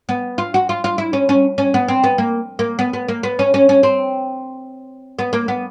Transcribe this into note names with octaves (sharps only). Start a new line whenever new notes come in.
B3
F4
F#4
F4
F4
E4
C#4
C#4
C#4
B3
C4
B3
A#3
A#3
B3
B3
A#3
B3
C#4
C#4
C#4
C4
B3
A#3
B3